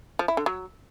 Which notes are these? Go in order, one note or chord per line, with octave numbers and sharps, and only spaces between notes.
F3
E4
D3
F#3